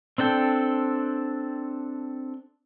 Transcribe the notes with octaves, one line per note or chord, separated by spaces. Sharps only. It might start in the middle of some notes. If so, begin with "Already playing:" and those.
C4 D4 A4 G5